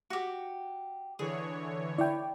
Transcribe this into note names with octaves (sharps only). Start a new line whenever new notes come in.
F#4 G4
D3 E3 G#4 C#5
E4 D5 G5